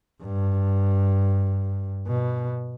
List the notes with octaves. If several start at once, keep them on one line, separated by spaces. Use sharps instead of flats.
G2
B2